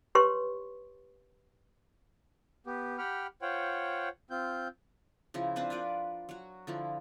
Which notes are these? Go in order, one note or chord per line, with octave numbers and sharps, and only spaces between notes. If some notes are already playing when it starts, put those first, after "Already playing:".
G4 B4 C#5 C6 C#6
B3 G4
G4 F#5 G5 B5 F6
F4 C5 C#5 F#5 G5
C4 F4 G6
C#3 F3 E4
C4 D4 B4 C5
F4 A#4 B4 D5
F#3 F#4
D3 F3 E4